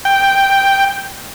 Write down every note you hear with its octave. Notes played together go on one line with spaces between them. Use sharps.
G5